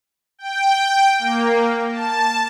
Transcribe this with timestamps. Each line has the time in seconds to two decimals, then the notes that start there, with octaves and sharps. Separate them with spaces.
0.39 G5
1.19 A#3
1.91 A5